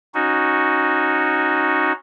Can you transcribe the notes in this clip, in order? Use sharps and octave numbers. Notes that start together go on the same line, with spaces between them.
C#4 D#4 F#4